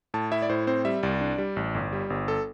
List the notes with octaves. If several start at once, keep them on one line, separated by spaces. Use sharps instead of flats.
A2 A5
E4 E5
D5
A2 C5
C4 C5
G3 E5
C2 D5
D4
G3
A1
G1
G3
G1
A4